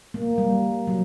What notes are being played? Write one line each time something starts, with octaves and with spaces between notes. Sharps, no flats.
A#3
G3
F#3